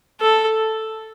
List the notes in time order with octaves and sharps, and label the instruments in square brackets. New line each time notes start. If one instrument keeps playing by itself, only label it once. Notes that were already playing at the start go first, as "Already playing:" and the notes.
[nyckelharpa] A4